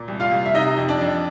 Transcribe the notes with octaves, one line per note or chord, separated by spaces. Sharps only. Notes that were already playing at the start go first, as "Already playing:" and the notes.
Already playing: A#2
C2
F4 F5
C2
E5
C3 D#4 D#5
F2
D4 D5
F2